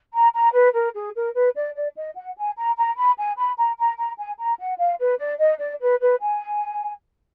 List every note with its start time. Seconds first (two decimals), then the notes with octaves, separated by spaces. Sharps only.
0.14 A#5
0.34 A#5
0.54 B4
0.75 A#4
0.95 G#4
1.15 A#4
1.35 B4
1.56 D5
1.75 D5
1.96 D#5
2.16 F#5
2.37 G#5
2.56 A#5
2.77 A#5
2.97 B5
3.18 G#5
3.37 B5
3.58 A#5
3.78 A#5
3.98 A#5
4.18 G#5
4.39 A#5
4.59 F#5
4.79 F5
5.00 B4
5.19 D5
5.39 D#5
5.60 D5
5.80 B4
6.01 B4
6.21 G#5